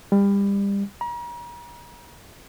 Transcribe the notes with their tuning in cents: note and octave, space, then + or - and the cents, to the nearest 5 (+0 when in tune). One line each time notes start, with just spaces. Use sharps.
G3 +30
A#5 +40